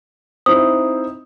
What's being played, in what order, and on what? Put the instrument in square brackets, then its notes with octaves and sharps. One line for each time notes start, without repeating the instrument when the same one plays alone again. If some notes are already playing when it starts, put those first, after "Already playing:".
[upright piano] C4 D#4 E4 [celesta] D#6